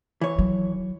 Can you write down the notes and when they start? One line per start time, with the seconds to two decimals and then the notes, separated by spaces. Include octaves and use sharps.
0.21 E3 C#5
0.38 D#3 F#3